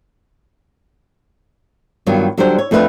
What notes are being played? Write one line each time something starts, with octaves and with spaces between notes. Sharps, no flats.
G2 D#3 F#3 B3 F4
D3 F#3 G3 D4 F4 C5
C#5
F2 A3 D4 B4 D#5 F5